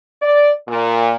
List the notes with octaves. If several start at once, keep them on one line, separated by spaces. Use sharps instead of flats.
D5
A#2